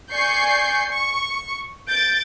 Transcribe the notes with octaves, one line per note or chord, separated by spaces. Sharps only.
D5 G#5 C#6 G6 C7
C#6
G6 A6 D7